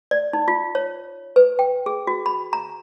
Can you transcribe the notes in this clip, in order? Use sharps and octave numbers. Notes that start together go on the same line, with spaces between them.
D5
D#4
F4
C#5
B4
G5
G#4
F#4
B5
A#5